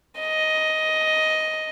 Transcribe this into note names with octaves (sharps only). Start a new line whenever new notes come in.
D#5